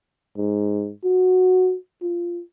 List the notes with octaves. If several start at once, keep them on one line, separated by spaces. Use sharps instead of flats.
G#2
F#4
F4